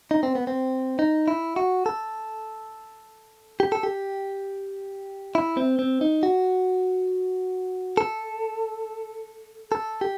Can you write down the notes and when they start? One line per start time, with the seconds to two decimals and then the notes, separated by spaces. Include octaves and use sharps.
0.11 D#4
0.23 C4
0.35 B3
0.47 C4
0.99 D#4
1.28 E4
1.56 F#4
1.86 A4
3.60 G4
3.72 A4
3.83 G4
5.35 E4
5.57 C4
5.79 C4
6.01 D#4
6.23 F#4
7.97 A4
9.72 A4
10.01 G4